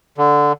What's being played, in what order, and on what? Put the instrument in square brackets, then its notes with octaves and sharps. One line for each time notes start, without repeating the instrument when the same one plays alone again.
[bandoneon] D3